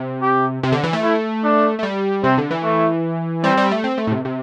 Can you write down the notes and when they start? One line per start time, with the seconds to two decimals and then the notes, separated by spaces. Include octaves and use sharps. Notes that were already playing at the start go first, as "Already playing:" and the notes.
Already playing: C3
0.22 G4
0.63 C3
0.72 D3
0.83 E3
0.93 A3
1.03 E4
1.44 D4
1.79 A3
1.83 G3
2.24 C3 C4
2.38 D3
2.51 E3
2.63 A3
3.44 G3 C4
3.57 G3
3.71 A3
3.84 C4
3.98 A3
4.07 A2
4.11 C3
4.25 C3